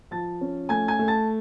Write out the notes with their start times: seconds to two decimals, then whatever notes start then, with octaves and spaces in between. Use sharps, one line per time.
0.11 F3 A5 A6
0.41 C#4
0.69 A3 G#5 G#6
0.88 G#5 G#6
0.99 A3
1.08 A5 A6